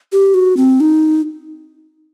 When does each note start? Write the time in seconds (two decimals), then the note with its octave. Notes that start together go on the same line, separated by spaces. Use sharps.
0.12 G4
0.34 F#4
0.57 C4
0.80 D#4